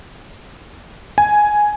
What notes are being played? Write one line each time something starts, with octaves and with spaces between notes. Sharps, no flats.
G#5